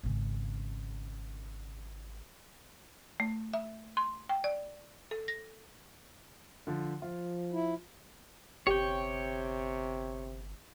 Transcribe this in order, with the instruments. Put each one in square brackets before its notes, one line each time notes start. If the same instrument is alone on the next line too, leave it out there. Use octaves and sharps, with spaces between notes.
[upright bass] G#1 C#3
[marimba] A3
E5
C6
G5
D5
A4
A#6
[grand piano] D3 F3
[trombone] F3 [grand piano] F4
[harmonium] E4
[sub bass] G1 [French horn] C3 [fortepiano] G4 [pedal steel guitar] C#5 G5